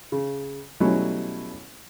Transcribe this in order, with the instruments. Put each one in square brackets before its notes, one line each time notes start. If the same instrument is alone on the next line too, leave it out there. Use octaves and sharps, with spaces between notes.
[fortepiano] C#3
B2 F#3 G3 A3 C#4 E4